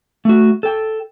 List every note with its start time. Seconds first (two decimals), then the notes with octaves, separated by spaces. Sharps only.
0.25 A3 F#4
0.63 A4 G5